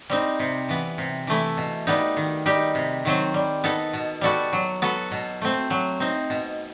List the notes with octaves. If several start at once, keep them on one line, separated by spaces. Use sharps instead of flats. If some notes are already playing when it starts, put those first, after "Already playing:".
G3 C4 D#4
C3
E3 B3
C3
E3 A3 E4
B2
G3 B3 D#4
D#3
G3 D#4 G4
C3
D#3 F#3 C4
G3
B3 D#4 A4
B2
G3 B3 F#4 A4
F#3
B3 F#4 A4
B2
A3 C4
F#3
C4 D#4
B2